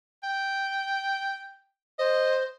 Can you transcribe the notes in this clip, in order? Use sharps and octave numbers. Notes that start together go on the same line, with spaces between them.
G5
C5 D#5